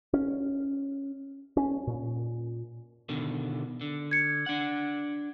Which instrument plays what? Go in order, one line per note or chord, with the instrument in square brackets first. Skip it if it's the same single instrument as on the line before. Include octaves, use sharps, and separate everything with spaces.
[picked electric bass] C#4
C#4
A#2
[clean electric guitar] B2 D3 D#3
D3
[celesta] G#6 C#7
[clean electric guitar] D4 F#5